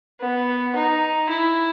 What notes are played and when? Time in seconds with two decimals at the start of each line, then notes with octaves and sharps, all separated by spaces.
0.20 B3
0.76 D#4
1.30 E4